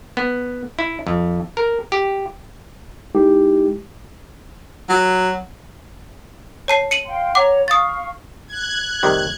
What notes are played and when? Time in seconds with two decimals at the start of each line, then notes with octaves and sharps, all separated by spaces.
0.17 B3
0.79 E4
1.07 F2
1.57 A#4
1.92 G4
3.15 G#3 D#4 E4 G4
4.90 F#3
6.68 C#5 A5 C7
6.91 C#7 D#7 F#7
7.06 F5 G5 C6
7.35 C#5 F#5 A#5 D6
7.68 F5 C#6 D#6 A6
8.47 F#6 G#6
9.03 F1 C3 D#3 G3